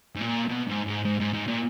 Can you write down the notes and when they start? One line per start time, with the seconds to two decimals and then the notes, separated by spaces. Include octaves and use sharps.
0.15 G#2
0.21 A#2
0.48 B2
0.68 G#2
0.87 G#2
1.05 G#2
1.20 G#2
1.34 G#2
1.48 A#2